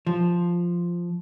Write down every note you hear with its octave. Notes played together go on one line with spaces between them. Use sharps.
F3